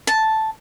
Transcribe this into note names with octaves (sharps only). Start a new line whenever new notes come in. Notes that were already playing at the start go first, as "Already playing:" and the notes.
A5